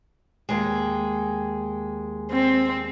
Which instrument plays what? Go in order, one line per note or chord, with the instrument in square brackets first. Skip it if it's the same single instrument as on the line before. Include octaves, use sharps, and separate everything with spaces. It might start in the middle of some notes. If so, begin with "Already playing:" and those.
[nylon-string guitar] D#2 G#3
[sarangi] C4